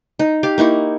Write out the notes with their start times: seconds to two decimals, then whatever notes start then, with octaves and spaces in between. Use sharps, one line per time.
0.19 D#4
0.43 G4 F5
0.58 A#3 D#4 E4 C#6